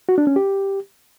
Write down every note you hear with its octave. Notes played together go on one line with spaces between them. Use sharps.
F#4
D4
C#4
G4